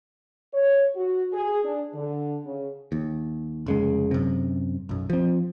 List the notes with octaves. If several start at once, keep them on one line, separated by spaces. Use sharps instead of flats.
C#5
F#4
G#4
D4
D3
C#3
D#2
F1 C#3 G#3
F#2 C3
B1 F#2
F3 C4